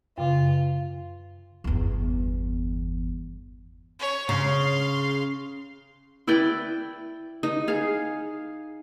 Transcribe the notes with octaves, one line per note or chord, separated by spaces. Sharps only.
F#2 C#3 F4
G1 E2
C#5
C#3 F5 C6
E4 B4 D5 G5
D#4
G#4 F5